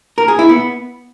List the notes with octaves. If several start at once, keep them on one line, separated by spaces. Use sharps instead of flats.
A#4
G#4
E4
B3